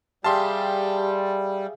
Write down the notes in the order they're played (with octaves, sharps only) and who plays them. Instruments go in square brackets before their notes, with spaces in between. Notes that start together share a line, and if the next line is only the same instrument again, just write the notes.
[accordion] G3 [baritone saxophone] G4 [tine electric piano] G#4 E5 F5 [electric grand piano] A5 C6